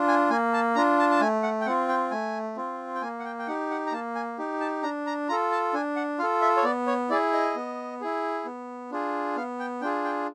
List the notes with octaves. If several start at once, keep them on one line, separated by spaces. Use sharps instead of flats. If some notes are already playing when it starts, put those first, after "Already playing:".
Already playing: D4 F4
G#5
A#3 G#5
A5
D4 F4 A#5
A5
A5
A3 G#5
F#5
G5
C4 F4 F#5
G5
A3 G#5
C4 F4
G5
A#3 G#5
F#5
G5
G5
D#4 G4 F#5
F#5
A#5
A#3 A5
G#5
D#4 G4
A5
D4 A#5
A#5
F4 A4 A#5
A5
D4 G#5
F#5
F4 A4 F5
E5
C#5
B3 D5
C#5
E4 G#4 D5
D#5
B3
E4 G#4
B3
D4 F4 G#4
B3 F5
G5
D4 F4 G#4 G5
G5